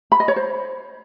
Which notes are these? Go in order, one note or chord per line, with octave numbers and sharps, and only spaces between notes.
B5
D#5
C#5
C5